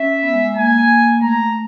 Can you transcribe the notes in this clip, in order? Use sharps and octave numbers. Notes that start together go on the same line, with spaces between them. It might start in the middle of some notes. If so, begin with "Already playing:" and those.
Already playing: C#4 E5
B3
G#3
G#3
A#3 G#5
A3 A#5